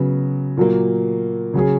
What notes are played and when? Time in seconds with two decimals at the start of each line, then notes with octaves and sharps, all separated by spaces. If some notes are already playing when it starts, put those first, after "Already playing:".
Already playing: C#3 F#3 B3
0.57 A#2 F#3 A#3
1.54 C#3 F#3 C#4 G#4